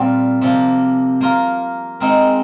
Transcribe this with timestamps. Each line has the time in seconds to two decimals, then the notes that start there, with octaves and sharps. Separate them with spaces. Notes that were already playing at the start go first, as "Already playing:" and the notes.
Already playing: A#2 G3 C4 F4
0.42 C3 F3 A#3
1.21 A#3 F4 A#4
2.00 G#3 C4 D#4 A#4